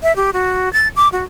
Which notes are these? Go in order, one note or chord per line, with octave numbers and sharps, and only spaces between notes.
E5
G4
F#4
A6
D6
F#4